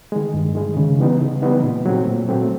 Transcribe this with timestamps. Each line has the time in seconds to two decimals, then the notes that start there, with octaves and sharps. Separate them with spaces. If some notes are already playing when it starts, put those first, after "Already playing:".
0.12 D#3 G#3
0.34 G2
0.55 D#3 G#3
0.77 C#3
0.99 E3 G3 B3 D#4
1.21 C#3
1.42 E3 G3 B3 D#4
1.63 A#2
1.86 F#3 A3 C4
2.07 A#2
2.29 F#3 A3 C4